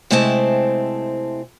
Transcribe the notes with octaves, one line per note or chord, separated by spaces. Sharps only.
C3 G#3 A3 C4 E4 A5